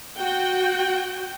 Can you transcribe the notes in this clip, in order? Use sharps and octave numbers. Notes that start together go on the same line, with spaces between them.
F#4 G5